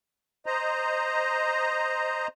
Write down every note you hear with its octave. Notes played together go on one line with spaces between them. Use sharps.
C5 D#5 A#5